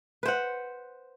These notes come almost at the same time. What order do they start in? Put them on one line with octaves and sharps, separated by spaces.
B4 C5 F#5